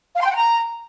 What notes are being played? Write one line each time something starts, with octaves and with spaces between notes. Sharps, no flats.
F5
C6
G5
F#5
A#5